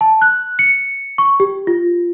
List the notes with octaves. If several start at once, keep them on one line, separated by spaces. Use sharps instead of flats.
A5
F#6
C#7
C#6
G4
F4